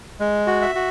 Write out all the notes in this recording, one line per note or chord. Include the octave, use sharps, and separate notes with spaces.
G#3
F#4
E5
F#4